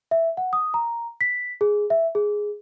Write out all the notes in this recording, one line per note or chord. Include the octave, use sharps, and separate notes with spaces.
E5
F#5
D#6
A#5
B6
G#4
E5
G#4